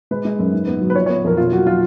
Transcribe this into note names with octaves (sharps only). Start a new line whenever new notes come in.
G#3 B4
G#3
F#2
G#2
B3
F#3
B4
F3 C#5
B3 C#5
F2 A#4
B2 F4
F#3 F#4
F#3 F4